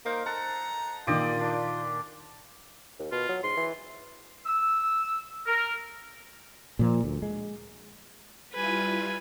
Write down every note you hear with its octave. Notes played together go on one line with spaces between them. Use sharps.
A#3 D#4 A#4 C5
A4 F#5 A#5
A#2 D#3 F4 G4 D5 D#5
D4 D6
D#2
B2 F4
F#3
G#2 C6
E3
E6
A#4
A#2 F3
D2
G#3
G3 E4 F4 B4 G#5